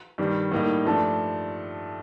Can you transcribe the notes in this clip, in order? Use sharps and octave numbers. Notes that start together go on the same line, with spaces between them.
G2 D#3 G3
A2 G3 A#3 D#4
G2 F3 A3 D4